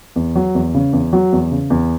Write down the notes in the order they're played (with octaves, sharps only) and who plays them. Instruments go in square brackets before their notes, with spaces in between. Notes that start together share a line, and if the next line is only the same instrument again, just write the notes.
[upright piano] E2
F#3
E2
C#3
E2
F#3
E2
C#3
E2